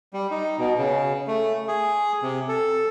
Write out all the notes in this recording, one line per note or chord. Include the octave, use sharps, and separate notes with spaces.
G3
D#4
B2
C#3
A3
G#4
C3
A4